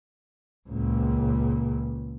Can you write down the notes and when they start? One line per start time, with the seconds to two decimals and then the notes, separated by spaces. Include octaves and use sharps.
0.69 C#2 A#2